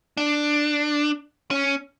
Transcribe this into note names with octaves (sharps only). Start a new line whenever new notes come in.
D4
C#4